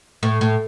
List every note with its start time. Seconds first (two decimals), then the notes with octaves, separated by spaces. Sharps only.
0.23 A2
0.41 A2